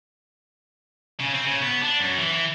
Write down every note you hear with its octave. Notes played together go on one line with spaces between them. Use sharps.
C#3
C4
C#3
B3
D4
F#2
E3
E3